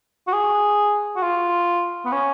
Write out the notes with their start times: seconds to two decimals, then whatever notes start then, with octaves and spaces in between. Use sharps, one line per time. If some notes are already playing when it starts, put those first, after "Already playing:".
0.28 F#4
0.33 G#4
1.16 F#4
1.23 F4
2.05 B3
2.12 C#4